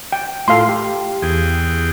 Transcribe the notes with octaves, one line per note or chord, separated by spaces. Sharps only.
G5
A2 F4 A4 F5 C6
G4
E2 G#4 G5